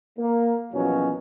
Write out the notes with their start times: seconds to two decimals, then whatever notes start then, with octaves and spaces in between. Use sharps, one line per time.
0.19 A#3
0.73 E2 B2 F3 F#3 C#4